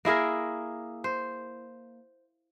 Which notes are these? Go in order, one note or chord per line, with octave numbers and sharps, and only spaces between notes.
A#3 E4 G#4 A#4
C5